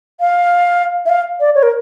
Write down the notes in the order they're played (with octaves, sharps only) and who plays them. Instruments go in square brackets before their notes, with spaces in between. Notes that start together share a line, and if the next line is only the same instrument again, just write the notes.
[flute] F5
E5
F5
D5
C#5
A#4